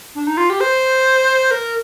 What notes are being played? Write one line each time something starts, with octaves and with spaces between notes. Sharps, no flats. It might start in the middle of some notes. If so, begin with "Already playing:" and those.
D4
D#4
F4
G4
C5
A#4